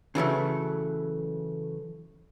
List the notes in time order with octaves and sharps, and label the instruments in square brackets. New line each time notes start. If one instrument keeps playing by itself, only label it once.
[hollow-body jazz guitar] C#3 E3 F#3 A3